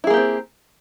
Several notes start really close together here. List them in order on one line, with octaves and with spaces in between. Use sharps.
E4 G#4 A#3 G4 C4